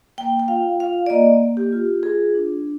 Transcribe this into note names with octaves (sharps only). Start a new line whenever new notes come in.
A#3 G5
G5
F4 F5
F4 F5
D5
A#3 D#5
A#3
G4
F4
F4 G#4
D4